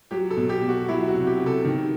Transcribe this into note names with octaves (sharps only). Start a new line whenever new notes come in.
F#3 G4
A4
B2
G4
B2
F#4
F#3 E4
F#4
C3
G4
C3
A4
D#3